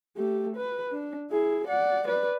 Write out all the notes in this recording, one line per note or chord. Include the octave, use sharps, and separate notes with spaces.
A3 G4
B4
D4
E4 G#4
D5 F#5
B4 D5